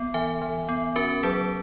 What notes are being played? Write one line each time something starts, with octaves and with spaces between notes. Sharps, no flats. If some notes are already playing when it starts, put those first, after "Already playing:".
Already playing: B3
E3 E5 G#5
E3
B3
C#4 F#4 A#4
F#3 G#4 B4